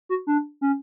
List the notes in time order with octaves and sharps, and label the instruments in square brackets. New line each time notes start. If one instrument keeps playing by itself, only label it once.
[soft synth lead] F#4
D4
C#4